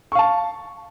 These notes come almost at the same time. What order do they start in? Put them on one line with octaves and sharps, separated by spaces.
C#6 F5 A5